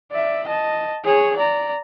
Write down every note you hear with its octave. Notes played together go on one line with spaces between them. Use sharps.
D5 E5
D#5 A5
G#4 C#5
D5 A#5